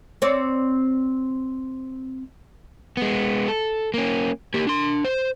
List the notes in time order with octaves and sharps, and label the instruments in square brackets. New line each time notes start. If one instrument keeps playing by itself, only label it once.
[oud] C4 C#5 D5
[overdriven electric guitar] G#3 B3
A4
A#3 C#4
A#3 G4
D4 C6
C5